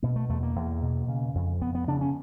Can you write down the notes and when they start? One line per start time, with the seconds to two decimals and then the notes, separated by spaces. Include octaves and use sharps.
0.02 B2 A#3
0.16 A3
0.29 E2 A3
0.43 A#3
0.56 E2
0.82 B2
1.08 C#3
1.35 F2
1.62 F2 B3
1.75 B3
1.88 C#3 D4
2.01 C#4